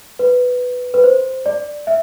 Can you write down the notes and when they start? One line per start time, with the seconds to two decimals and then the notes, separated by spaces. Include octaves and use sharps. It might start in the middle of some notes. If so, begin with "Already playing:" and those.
0.19 B4
0.94 B4
1.04 C5
1.46 D5
1.87 E5